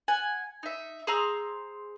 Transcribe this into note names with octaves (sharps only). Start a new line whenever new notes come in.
F#5 G#5
D#4 E5
G#4 C5 A#5 E6